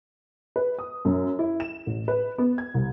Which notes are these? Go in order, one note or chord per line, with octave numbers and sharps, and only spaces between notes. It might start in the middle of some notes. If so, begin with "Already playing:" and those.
B4
D#6
F#2
E4
E7
A1
B4
B3
G#6
C2